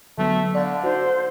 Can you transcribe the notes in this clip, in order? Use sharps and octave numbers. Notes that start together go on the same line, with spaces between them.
D3 F#3 A3 B3
D3 D5 F5
D#4 F#4 C5